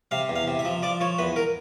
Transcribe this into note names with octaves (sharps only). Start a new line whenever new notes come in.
C3 F5
E2
F5
C3
E5
F3
F3 D5
F3 C#5
E2 B4
A#4